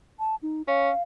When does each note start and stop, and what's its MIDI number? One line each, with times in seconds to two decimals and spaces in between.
0.19 0.35 81
0.43 0.62 63
0.68 0.90 61
0.68 1.02 77